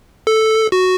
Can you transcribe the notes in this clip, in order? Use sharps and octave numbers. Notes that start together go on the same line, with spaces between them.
A4
F#4